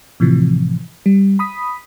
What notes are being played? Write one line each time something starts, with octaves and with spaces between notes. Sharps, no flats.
A2 C3 E3 F3
G3
B5 D#6 B6